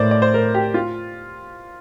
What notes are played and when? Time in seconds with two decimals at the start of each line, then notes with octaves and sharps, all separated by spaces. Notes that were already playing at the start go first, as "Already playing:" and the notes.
Already playing: A2 A#4 C5 D5
0.11 D5
0.22 C5
0.34 A#4
0.54 G4
0.74 F4